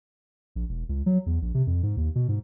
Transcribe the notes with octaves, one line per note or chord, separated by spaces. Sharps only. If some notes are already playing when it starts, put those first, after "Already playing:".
A#1
E1
C#2
F#3
E2
A#1
C3
F2
G#2
D#2
B2
G#2